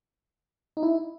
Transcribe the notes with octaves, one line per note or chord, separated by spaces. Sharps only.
D#4
E4